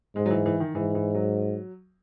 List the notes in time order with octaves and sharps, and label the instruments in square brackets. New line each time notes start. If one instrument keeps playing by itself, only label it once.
[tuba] G#2 [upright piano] G#3
[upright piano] F#3
E3
E3
D#3
[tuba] G#2 [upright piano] E3
[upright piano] E3
F#3